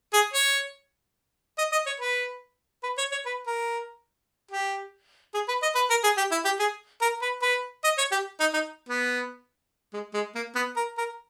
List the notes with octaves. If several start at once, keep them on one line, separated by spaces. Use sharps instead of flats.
G#4
C#5
D#5
D#5
C#5
B4
B4
C#5
C#5
B4
A#4
G4
G#4
B4
D#5
B4
A#4
G#4
G4
E4
G4
G#4
A#4
B4
B4
D#5
C#5
G4
D#4
D#4
B3
G#3
G#3
A#3
B3
A#4
A#4